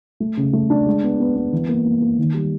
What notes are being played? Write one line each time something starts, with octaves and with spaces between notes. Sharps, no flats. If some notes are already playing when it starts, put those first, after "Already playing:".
A3
C#3
A3
D4
G#3
B3
B3
B3
E3
A#3
A#3
A#3
D#3
G3